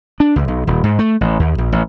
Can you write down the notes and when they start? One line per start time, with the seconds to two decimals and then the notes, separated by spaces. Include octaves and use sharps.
0.20 D4
0.36 C#2
0.48 B1
0.67 D#1
0.84 G#2
0.99 A3
1.21 A1
1.40 D#2
1.58 A#1
1.72 A1